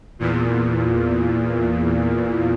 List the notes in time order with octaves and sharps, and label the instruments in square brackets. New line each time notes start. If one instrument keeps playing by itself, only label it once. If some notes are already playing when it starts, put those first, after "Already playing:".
[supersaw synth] E2 A#2